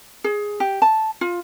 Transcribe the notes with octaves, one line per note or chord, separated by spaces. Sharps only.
G#4
G4
A5
F4